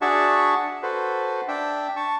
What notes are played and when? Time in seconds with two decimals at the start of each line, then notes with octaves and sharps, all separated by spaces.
0.02 D4 F#4 G#4 E5 A5 C#6
0.83 F#4 A4 B4 C5
1.48 D4 E5 G5
1.96 A5 C#6